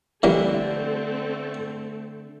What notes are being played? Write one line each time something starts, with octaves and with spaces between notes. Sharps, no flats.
D3 E3 G3 A3 A#3 C4 A4